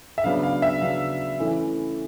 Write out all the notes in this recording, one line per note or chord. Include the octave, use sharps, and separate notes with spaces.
E5
C#3 F#3 B3 D4 F5
F5
E5
C#3 F#3 B3 D4 F5
E3 A3 C#4 E4